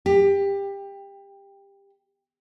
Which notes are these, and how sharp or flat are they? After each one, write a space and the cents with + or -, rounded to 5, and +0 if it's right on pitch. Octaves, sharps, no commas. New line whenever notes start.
G4 +20